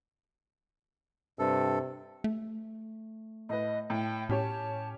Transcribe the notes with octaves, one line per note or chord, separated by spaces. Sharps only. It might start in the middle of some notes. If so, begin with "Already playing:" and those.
G2 C3 A4
A3
A2 B4 D#5
A2 G5
A2 C#4 G4 C#5 A5